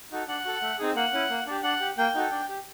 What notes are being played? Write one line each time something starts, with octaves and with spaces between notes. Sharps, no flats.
D#4 F#4 A4
D4 F#5
F#4 A4
A3
C4 D#4 G#4
A#3 F#5
C#4 E4
A#3
D4 G4
D4 F#5
G4
A#3 G5
D#4 F#4 A4
D4
G4